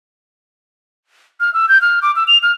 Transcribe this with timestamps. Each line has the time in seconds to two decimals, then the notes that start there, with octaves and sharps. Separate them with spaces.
1.40 F6
1.54 E6
1.69 G6
1.82 F6
2.02 D6
2.16 E6
2.28 F7
2.43 F6